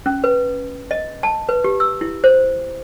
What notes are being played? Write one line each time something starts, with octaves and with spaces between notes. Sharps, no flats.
C#4
B4
D#5
A5
B4
G4
E6
E4
C5